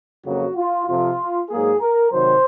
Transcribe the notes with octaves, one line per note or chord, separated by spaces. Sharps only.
F2 C#3 F#3 A#3 F#4
F4
F2 C3 F3 F4
G#2 F#3 A#3 G#4
A#4
C3 D#3 F#3 C5